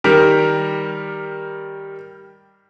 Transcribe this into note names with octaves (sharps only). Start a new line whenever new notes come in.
D#3 G3 G4 A#4